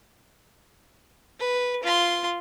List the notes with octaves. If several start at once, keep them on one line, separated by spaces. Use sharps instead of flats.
B4
F4 C6